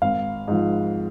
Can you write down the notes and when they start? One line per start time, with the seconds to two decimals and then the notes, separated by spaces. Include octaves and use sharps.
0.02 G#1 F5
0.48 G#2 F3